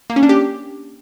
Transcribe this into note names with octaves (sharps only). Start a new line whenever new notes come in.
A#3
C#4
D4
G4